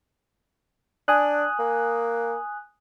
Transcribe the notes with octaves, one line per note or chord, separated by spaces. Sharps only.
D4 G#5 D#6 F#6
A#3